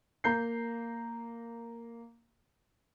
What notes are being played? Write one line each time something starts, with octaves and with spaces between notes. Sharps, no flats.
A#3 A#5 G6 C7